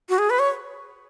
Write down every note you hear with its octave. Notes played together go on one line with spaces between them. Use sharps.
F#4
G#4
B4
C#5